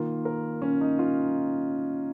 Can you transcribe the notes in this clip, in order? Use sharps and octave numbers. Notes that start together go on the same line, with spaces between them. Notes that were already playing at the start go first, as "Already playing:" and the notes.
Already playing: D#3 A#3 F4
A#4
C#4
D#4
F4